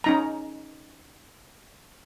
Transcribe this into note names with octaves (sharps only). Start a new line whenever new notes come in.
C#4 D#4 A#5